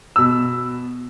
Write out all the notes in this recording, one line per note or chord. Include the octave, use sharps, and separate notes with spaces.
B2 E6